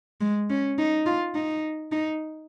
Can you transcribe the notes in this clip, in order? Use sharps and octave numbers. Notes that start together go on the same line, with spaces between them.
G#3
C#4
D#4
F4
D#4
D#4